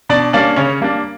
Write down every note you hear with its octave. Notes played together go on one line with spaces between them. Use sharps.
B2 D4 D5
G3 A#3 C#4 D4 D5
C#3 C#4 C#5
G3 A#3 D4